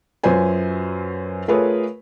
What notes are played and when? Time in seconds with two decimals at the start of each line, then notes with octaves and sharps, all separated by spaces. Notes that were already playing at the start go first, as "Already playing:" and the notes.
0.23 F#2 F#3 F4 B4 C5 G#5
1.48 A3 F4 G#4 A#4 B4 C#5